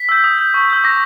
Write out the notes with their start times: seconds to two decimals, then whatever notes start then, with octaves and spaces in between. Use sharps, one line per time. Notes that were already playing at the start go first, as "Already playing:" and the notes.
Already playing: B6
0.09 E6 G6
0.24 D#6
0.38 G6
0.54 C#6
0.70 E6 G6
0.84 D6 A#6